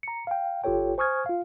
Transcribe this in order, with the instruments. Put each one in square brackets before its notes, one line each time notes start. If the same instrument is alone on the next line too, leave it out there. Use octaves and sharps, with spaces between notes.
[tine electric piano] A#5 C#7
F5 G5
G1 F4 G4 A4 C#5 G5
C5 G#5 C#6 D#6 F6 G#6
F4 F5